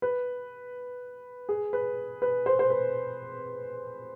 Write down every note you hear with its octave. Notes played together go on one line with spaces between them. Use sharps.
B4
G#4
B4
B4
C5
C5
B4